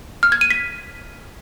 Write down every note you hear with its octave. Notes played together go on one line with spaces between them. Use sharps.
F6
G#6
D#7
B6